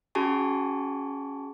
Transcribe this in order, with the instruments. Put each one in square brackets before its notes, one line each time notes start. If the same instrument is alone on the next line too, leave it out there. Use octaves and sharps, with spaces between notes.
[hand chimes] C#4 F#4 G#4 G#5 A5 C#6